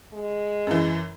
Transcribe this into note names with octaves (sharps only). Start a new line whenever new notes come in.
G#3
F#2 E3